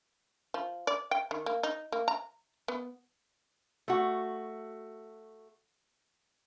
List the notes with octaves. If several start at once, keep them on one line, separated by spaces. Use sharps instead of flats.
F3
D5
G5
D#3
A#3
D#4
A#3
A#5
B3
A3 F#4